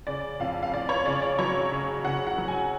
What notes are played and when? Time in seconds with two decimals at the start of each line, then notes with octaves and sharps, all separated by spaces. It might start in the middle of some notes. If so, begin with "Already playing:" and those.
0.07 C#3 D5
0.40 F2 F5
0.63 F5
0.74 F2 D5
0.89 C#5
1.06 C#3 D5
1.22 D5
1.39 F#3 C#5
1.72 C#3
2.05 C#3 F#5
2.27 F#5
2.38 F#3
2.48 G#5